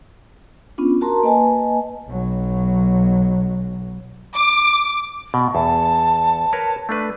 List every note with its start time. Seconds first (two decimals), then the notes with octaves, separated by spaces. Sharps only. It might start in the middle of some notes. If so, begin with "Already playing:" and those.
0.78 B3 C#4 D4 F4
1.01 F#4 A#4 A5 A#5 C6
1.23 A#3 B4 D#5 G#5 A5
2.09 B1 F#3
4.35 D6
5.34 B2
5.55 E2 A5
6.53 A#4 B4 C#5
6.89 A3 D4 B4